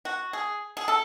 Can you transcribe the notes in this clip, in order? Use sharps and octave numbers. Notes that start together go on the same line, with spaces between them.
F#4
G#4
G#4
A4